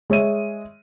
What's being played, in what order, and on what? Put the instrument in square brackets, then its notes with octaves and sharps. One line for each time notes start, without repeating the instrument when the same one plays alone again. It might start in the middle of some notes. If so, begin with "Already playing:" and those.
[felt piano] G#3 C#5 E5 D#7